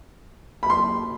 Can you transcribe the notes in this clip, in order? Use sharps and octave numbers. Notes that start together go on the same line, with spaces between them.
B5
C6